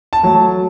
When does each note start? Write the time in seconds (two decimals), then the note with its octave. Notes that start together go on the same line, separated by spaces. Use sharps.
0.13 A5
0.23 F#3 A3